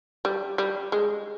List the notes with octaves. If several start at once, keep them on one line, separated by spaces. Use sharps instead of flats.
G3
G3
G#3